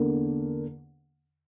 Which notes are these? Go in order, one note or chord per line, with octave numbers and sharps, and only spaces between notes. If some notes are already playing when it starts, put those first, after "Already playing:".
Already playing: E2 D3 A#3 D4